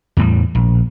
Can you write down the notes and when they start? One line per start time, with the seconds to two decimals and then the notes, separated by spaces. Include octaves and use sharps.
0.17 E2 A2 F#3 G3
0.55 A#1